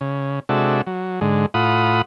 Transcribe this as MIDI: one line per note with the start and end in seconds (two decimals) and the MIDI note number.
0.01 0.40 49
0.49 0.82 48
0.49 0.82 56
0.49 0.82 62
0.49 0.82 66
0.49 0.82 69
0.49 0.82 76
0.87 1.20 54
1.21 1.46 44
1.21 1.46 50
1.21 1.46 56
1.54 2.02 45
1.54 2.02 65
1.54 2.02 78
1.54 2.02 83
1.54 2.02 87